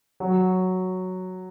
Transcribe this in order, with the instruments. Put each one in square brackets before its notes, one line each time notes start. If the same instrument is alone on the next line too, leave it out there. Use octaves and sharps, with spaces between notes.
[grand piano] F#3